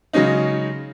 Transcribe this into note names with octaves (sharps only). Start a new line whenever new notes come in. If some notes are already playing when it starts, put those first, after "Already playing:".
C#3 F#3 G#3 C#4 D#4